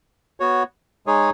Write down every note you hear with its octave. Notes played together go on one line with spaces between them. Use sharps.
B3 F#4 C#5
G#3 D#4 G#4 C#5